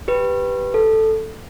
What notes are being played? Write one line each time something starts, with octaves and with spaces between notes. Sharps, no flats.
G4 B4
A4